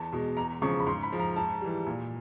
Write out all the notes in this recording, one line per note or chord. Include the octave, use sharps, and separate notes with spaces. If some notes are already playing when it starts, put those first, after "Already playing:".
Already playing: E2 A5
B2 G#3
E2 A#5
C#3 F3 G#3 C#6
B5
G#2 C6
B5
F3 G#3
A#5
G#2 A5
E3 G3
A#2